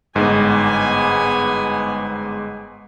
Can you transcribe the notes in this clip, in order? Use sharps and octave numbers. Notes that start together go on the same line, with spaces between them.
G1 G#2 B3 G#5